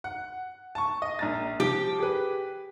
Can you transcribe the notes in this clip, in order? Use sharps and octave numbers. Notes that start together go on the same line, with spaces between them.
F#5
A5 C#6
D#5
A#1 A#5 A6
F3 G4
G#4 B4